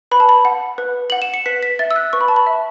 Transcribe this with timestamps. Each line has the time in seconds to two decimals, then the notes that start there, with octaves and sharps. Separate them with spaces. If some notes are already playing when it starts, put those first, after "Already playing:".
0.11 B4 B5
0.20 A5
0.29 B5
0.45 F#5
0.78 B4
1.10 F#5 F#7
1.22 E7
1.34 C#7
1.46 B4 B6
1.63 B6
1.79 E5 A6
1.91 E6
1.96 F#6
2.13 B4 C#6
2.21 B5
2.28 A5
2.36 B5
2.47 E5